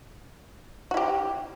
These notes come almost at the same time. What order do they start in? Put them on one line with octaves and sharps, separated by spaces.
F#4 E4 G4